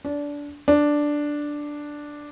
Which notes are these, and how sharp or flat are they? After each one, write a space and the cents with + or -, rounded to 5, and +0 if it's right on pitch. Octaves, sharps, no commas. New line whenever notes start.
D4 -20
D4 +0